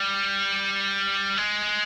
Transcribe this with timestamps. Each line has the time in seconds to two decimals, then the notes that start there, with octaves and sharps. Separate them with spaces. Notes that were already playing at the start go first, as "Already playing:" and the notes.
Already playing: G3
1.37 G#3